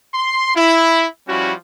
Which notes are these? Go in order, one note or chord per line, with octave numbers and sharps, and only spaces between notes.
C6
E4
F3 G3 C#4 E4 F#4